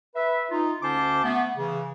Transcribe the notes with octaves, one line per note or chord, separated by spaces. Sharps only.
B4 E5
D#4 F4
D2 D3 C#4 C5 A5 D6
A3 B3
C#3 E3